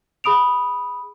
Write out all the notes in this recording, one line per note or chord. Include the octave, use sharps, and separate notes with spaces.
G#4 B5 D#6 D7 F7